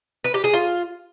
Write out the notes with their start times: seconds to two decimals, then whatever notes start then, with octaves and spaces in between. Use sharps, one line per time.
0.24 B4
0.34 G4
0.44 G#4
0.54 F4